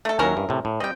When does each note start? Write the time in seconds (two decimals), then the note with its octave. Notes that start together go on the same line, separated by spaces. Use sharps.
0.05 A3 A4
0.19 D#2 F#3 C#4 E4 A#4
0.37 G2
0.49 A2 C3
0.65 A2
0.80 G3 C4 D#5 G5